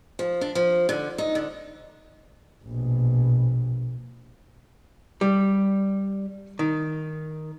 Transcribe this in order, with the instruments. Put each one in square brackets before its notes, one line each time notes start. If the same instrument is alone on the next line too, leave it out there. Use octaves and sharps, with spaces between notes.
[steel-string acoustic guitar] F3
D4
F3
D3
D#4
D3
[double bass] A#1 B2
[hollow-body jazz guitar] G3
D#3